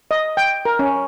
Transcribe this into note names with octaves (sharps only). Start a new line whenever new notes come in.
D#5
G5
A#4
C#4